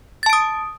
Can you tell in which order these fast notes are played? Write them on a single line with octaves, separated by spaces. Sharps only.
A6 A5 D7 D#6